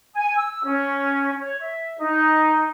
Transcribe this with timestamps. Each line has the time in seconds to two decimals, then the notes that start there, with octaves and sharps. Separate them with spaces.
0.14 G#5
0.36 E6
0.64 C#4
1.39 C#5
1.60 E5
1.99 D#4